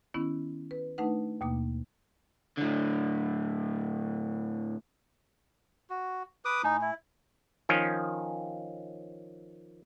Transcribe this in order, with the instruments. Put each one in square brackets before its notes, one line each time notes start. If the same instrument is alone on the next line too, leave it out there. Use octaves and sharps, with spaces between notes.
[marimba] D#3 B3 C#4 E4
B4
A3 D4 D#4 B4 F#5
D#2 B2 A#3 D6
[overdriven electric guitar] A2 D3
[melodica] F#4
B4 D6 D#6
[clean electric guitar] A2 G#5 [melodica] D#4
[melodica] E4
[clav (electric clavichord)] D#3 F3 C#4